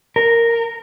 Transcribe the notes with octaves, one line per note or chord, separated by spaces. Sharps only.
A#4